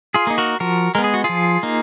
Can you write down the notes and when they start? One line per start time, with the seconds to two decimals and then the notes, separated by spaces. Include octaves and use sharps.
0.14 F4 G#4
0.27 A#3 D#4
0.38 F#4 A#4
0.60 F3 F#4 A#4
0.95 G#3 B3 A#4
1.04 G#4
1.14 F#4
1.24 F4 G#4
1.29 F3
1.63 A#3 D#4